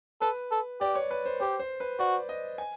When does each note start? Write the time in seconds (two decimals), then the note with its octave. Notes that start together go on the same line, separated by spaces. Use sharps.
0.21 A4 B4
0.51 A4
0.81 G4 D5
0.95 C#5
1.11 B4
1.25 C5
1.40 G4 C5
1.59 C5
1.80 B4
1.99 F#4 D5
2.29 D#5
2.58 G#5